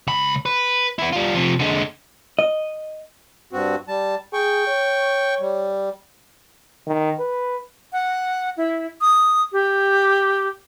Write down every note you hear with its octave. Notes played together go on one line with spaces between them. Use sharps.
C#2 B5
B4
B3 E4
G3 F4
C3 F3
D3 G#3
D#5
G2 C4 F#4
G3 A5
G#4 G5 C#6
C#5
G3
D#3
B4
F#5
E4
D#6
G4